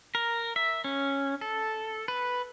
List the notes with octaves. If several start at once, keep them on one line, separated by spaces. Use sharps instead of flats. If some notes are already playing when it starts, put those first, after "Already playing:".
A#4
E5
C#4
A4
B4